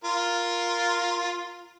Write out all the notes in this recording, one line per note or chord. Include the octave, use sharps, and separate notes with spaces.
F4 A#4